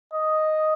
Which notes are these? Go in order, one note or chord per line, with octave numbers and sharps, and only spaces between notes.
D#5